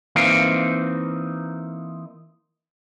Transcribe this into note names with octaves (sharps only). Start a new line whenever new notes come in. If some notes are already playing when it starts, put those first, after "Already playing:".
E3 A#3 C4 D#4 F5